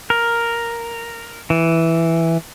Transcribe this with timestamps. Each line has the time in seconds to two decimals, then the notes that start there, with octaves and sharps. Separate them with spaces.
0.10 A#4
1.50 E3